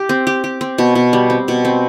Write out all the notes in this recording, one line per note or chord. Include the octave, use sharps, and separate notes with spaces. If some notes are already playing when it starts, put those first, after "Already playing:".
Already playing: G4
C4
G4
G4
C4
B2
B2
G3
C4
B2
C4